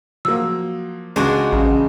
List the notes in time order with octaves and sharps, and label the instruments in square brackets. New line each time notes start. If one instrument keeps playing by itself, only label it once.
[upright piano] F3 F#3 A#3 [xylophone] E6
[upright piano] C#2 [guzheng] G#3 D4 F#4
[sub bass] A1 [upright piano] C#3